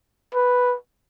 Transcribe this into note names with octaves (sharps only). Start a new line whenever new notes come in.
B4